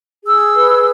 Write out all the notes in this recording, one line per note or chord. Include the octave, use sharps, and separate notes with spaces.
G#4 E6
B4